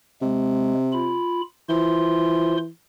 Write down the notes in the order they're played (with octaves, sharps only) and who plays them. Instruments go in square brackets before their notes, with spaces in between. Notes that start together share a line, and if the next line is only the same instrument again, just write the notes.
[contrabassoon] C3 [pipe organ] G#3
[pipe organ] F4 B5
[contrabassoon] E3 [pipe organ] F4 C5 C6